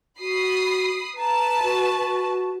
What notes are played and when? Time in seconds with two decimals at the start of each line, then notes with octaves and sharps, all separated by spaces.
0.20 F#4 B5 D#6 C7
1.17 B4 A5 A#5
1.63 F#4